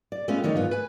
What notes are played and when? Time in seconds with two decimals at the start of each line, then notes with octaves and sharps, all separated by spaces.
0.12 D5
0.28 G#3 A3 B3 C#4 F4
0.43 F2 D#3 D#4 C#5 D5
0.56 G#2 B3 F4
0.71 B4 G#5